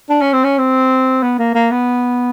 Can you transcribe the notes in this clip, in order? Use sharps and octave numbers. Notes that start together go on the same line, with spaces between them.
D4
C#4
C4
C#4
C4
B3
A#3
A#3
B3